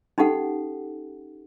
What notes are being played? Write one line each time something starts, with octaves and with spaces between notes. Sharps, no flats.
C#4 D#4 G4 A4 F#5